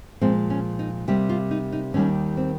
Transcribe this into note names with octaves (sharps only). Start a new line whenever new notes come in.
A#2 F3 G#3 C4
C#4
D#4
C3 G3 A#3 G4
F4
D#4
D#4
D#2 D#3 G3 A#3 C#4
C4